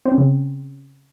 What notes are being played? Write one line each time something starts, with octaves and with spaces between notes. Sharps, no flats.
C4
C#4
C#3